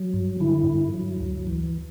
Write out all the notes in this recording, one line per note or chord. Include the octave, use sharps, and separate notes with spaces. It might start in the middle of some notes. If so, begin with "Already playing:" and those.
Already playing: F#3
G2
D3 E4
G2
F#3
D2
E3